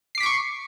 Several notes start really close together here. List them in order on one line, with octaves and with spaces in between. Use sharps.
C7 D6 B6 D7 C#6